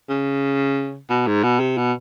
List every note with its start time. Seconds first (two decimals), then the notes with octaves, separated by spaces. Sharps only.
0.10 C#3
1.10 B2
1.27 G#2
1.44 B2
1.60 C3
1.78 B2